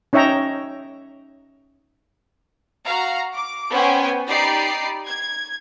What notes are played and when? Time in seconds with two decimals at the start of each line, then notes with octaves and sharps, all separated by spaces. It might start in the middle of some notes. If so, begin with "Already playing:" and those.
0.13 C#4 D#4 C#5 E5 G5 A#5
2.85 F#4 F5 A#5
3.34 D6
3.71 B3 C#4 C5 G5 G#5
4.30 D#4 G4 D5 B5 C7
5.07 G#6